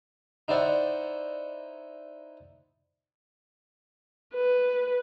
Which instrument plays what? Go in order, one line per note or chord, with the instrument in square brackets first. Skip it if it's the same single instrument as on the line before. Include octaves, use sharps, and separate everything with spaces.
[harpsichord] D#4 E4 C5 D5 F#5 C#6
[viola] B4